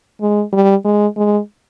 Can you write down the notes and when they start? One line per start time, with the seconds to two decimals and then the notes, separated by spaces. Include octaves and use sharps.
0.21 G#3
0.53 G3
0.85 G#3
1.17 G#3